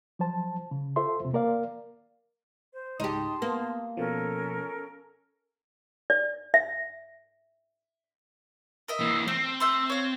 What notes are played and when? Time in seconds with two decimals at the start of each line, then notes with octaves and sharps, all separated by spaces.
0.19 F3 F#3 C5 A5
0.71 C#3
0.96 F4 A4 C5 E5 C6
1.20 E2 C3
1.33 A#3 A#4 D5 F5
2.72 C5
3.00 C#2 G#2 D#4 G4 A5 C6 D#6
3.42 A#3 B3
3.97 B2 F3 C#4 A4 A#4
6.10 D5
6.54 E5
8.88 A#4 D#5 E5
9.00 E3 A#3
9.28 A3 C4
9.60 A3 E5 C6
9.90 C#5 F5